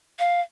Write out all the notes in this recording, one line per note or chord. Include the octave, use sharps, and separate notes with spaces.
F5